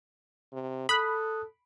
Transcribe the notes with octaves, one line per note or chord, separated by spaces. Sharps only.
C3
A4 B5 D#6 F#6